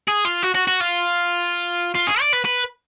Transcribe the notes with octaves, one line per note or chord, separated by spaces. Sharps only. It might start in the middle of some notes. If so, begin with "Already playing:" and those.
G#4
F4
F#4
F#4
F#4
F4
F4
G#4
D5
B4
B4